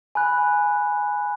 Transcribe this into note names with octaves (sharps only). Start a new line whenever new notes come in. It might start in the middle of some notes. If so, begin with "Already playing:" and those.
G#5 B5 F#6